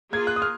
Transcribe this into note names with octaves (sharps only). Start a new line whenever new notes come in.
A#3 F4 G#4 G#6
F#6
D#6
F6